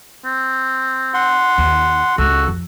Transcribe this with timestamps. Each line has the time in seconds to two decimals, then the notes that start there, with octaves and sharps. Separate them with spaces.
0.25 C4
1.14 F#5 C6
1.58 D#2
2.18 C#2 F#4 A4
2.48 F2